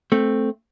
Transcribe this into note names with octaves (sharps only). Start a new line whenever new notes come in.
A3 C4